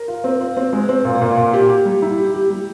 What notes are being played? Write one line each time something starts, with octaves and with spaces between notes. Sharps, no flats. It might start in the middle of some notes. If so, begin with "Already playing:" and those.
Already playing: A#4
F4
C4
F4
C4
G#3
C4
A#2
A#2
A#2
G4
G4
G3
E4
G4
G4
G3